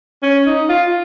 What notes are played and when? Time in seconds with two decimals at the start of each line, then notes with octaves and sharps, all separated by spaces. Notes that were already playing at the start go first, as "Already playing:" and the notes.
0.23 C#4
0.46 D#4
0.69 F4